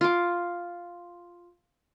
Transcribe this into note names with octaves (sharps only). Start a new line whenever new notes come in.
F4 D6